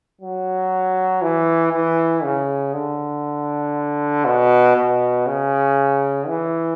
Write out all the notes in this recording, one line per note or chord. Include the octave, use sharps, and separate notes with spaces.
F#3
E3
E3
C#3
D3
B2
B2
C#3
E3